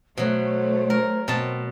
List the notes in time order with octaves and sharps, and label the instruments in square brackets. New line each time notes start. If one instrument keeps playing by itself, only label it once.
[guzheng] B2 F#3 [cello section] A3 [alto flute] C5
[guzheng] A#4
[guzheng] B2 A5 [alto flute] C4